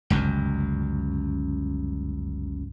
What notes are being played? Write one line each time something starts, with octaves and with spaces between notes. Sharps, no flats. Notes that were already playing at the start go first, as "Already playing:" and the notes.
G1 C#2 F#2